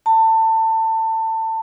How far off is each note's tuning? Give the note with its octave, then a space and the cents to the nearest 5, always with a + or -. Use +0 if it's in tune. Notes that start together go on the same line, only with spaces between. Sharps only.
A5 +25